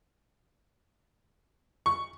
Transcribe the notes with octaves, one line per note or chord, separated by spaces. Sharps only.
C#6